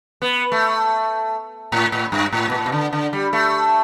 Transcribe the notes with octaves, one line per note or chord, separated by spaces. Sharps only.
B3
A3
A2
A2
G2
A2
B2
A2
B2
D3
D3
G3
A3